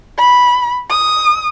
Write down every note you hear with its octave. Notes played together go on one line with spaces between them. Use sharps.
B5
D#6